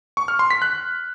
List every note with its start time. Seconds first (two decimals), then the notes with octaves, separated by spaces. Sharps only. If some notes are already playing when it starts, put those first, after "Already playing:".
0.17 C#6
0.28 F6
0.39 C6
0.51 B6
0.62 F#6